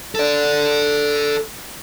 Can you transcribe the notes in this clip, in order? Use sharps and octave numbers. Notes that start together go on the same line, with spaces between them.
A4 D5